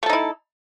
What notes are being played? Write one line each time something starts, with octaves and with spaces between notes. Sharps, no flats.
A3 D#4 E4 A4